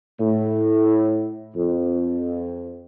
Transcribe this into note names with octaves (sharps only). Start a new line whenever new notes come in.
A2
F2